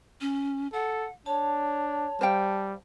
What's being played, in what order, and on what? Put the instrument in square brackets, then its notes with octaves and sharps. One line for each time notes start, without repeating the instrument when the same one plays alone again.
[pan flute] C#4
[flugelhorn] A4 [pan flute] F#5
[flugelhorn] D4 [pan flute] C#5 [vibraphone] A5
[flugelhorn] G3 [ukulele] C5 F5 G5